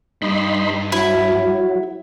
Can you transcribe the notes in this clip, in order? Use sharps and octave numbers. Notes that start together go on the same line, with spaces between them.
G2 D#4 B5 C6
F#3 E4